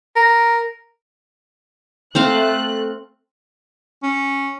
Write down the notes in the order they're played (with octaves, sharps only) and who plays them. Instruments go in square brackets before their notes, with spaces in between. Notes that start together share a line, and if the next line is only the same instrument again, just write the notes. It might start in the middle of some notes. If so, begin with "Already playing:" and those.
[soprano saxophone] A#4
[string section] A3 F#6 [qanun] C4 C5 F5
[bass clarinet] C#4